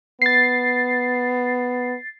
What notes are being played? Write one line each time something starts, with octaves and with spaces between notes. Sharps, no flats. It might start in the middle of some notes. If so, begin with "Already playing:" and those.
B3 A6 C7